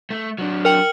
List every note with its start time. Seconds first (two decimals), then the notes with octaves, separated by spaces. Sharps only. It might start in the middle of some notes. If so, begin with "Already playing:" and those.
0.10 A3
0.38 F#3 D4
0.65 A#4 G5 F6 C#7 F#7